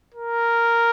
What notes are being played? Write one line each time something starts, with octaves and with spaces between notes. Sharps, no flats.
A#4